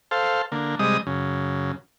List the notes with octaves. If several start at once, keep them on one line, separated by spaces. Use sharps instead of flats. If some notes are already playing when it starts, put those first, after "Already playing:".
A4 C5 F5
D3 A#3
C3 G3 G#3 D#5 D#6
F#2 C#3